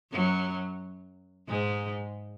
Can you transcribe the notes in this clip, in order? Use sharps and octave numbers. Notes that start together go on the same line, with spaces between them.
F#2 F#3
G#2 G#3